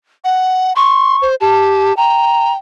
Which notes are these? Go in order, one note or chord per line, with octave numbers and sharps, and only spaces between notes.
F#5
C6 C#6
C5
G4 A5
G5 A#5